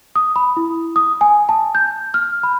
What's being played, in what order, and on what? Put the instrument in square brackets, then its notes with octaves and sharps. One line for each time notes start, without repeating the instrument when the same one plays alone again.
[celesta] D#6
B5
E4
D#6
G#5
A5
G6
F6
B5